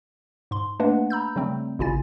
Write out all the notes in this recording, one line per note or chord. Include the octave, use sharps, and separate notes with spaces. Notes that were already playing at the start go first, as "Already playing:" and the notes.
G#2 C6
A3 A#3 D4 B4 D#5 F#5
A#5 B5 E6 G6
C#3 F#3 G3 A3 C4
A1 C#3 E4 F4 G#5 A6